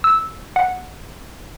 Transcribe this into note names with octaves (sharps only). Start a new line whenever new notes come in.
E6
F#5